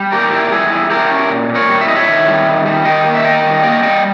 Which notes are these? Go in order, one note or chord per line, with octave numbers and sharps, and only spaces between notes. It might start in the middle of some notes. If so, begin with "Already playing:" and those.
Already playing: G3
A#2 G4 A#4
E4
G3 E4 G#4
E4
E4 G4 A#4
C#4
A#2
A#2
A#4 C#5
G3
E5
E4 D#5
C#5 E5
D#3
G3
D#3
G3
D#3 D#5 G5
A#3
E5
D#3 D#5 G5
G3
A#3 D#5 G5
G3 D#5 G5